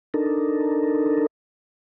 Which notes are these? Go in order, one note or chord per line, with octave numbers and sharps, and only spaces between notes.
D4 D#4 A4 A#4